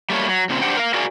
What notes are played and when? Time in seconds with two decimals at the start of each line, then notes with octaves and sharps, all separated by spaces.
0.10 G3 A3 A#3 C#5
0.29 F#3
0.49 A#2 C#3 C4
0.62 D4 G4 C5 F#5 G5
0.77 A#4 F5
0.94 F#4 G#4 A#4 D5 F5 G#5